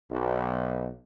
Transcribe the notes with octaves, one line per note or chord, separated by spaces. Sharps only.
B1